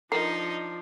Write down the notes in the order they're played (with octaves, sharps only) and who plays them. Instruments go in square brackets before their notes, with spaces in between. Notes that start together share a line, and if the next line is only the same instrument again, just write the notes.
[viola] F3 D4 [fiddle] D#4 [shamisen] A#4 [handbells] C7